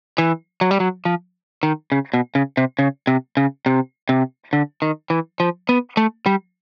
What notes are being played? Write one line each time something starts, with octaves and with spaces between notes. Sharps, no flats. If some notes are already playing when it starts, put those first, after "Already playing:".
E3
F#3
G3
F#3
F3
D#3
C#3
B2
C#3
C3
C#3
C3
C#3
C3
C3
D3
D#3
E3
F3
B3
A3
G3